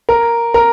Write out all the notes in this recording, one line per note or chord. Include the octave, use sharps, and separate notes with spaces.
A#4
A#4